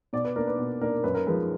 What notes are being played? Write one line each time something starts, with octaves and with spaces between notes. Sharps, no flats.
B2 D5
B4
A#3 D4 A#4
B4
B2
A#3 D4 A#4
F#2 B4
A#4
F3 G#3 B4